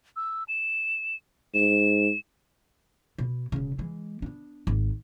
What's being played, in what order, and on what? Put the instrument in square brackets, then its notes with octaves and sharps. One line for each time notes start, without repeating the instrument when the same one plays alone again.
[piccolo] E6
E7
[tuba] G#2 [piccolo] E7
[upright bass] B2
E1 C#3
E3 G#3
B3 D4
G#1